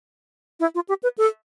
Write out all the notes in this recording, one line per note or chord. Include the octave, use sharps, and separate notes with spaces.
E4
F4
G4
B4
A4